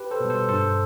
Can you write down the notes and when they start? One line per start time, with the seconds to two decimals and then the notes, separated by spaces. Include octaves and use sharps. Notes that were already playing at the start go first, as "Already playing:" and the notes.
Already playing: G4 B4
0.11 A4 C5
0.20 B2 G3
0.30 A4 C5
0.49 G2 A4 C5